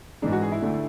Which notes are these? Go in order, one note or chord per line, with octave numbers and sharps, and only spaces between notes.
G#2 E3 G#3 D4
F#4
G#4
E4
D2 D3 A3